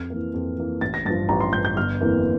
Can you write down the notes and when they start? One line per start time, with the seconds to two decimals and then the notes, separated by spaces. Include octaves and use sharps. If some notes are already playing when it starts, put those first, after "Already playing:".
Already playing: F2 F6
0.10 E3 A#3
0.34 F2
0.58 E3 A#3
0.81 A1 A6
0.94 A#6
1.05 G2 A6
1.10 F3
1.29 A1 A#5
1.40 C6
1.53 G2 F3 G6
1.65 G6
1.76 G1 F6
2.01 F2 E3 A#3